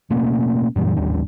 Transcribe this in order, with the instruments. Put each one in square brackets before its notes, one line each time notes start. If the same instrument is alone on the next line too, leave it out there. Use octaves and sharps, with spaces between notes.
[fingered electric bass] B2 A3 A#3 C#4
F#2 A#2 E3 G3
A1 D#2 G3 D4